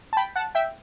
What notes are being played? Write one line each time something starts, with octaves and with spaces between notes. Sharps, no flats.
A5
G5 B5
F#5 A5
E5 G5